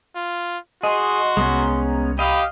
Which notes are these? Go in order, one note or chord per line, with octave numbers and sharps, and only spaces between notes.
F4
F#4 G#4 D#5 C6
C2 G#3 B3 C#4 A#5
G4 D#5 F5 B5